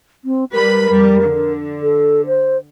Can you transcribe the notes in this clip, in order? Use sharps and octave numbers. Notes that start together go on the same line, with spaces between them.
C4
G3 A#4 B4 B5
F2 G3
D3
A4
C5